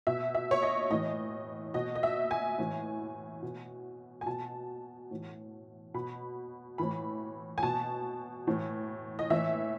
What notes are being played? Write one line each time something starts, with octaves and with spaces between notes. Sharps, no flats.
B2 E5
E5
C#5
D#5
A2 E3 D#5
B2 D#5
D#5
E5
G#5
A2 E3
B2
G#5
B2 A5
A2 E3
B2 B5
A2 E3 B5
G#5
B2 A5
A2 E3
D#5
A2 E3 E5